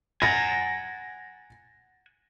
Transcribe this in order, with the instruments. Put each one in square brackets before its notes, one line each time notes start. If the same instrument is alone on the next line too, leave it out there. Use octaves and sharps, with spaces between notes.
[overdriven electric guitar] F#5 G#5 [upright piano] A6 A#6